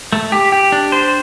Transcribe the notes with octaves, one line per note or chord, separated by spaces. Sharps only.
A3
G4
G4
D4
C5